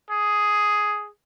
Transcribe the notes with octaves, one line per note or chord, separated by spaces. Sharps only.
G#4